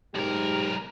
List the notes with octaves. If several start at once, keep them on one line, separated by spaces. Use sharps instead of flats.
B1 G#2 G4 A#4